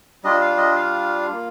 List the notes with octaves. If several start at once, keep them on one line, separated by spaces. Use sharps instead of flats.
G3 D4 F4 D#5
F5
D#5
F5
A#3 F4